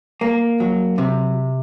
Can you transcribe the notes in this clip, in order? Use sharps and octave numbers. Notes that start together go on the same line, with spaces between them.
A#3
F#3
C3